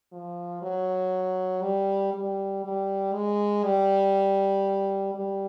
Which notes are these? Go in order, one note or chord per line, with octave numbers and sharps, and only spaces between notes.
F3
F#3
G3
G3
G3
G#3
G3
G3